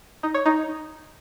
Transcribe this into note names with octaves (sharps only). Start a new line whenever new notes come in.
D#4
C#5
D#4